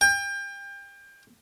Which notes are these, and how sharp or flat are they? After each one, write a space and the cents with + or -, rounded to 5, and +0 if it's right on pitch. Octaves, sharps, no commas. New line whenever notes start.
G5 +30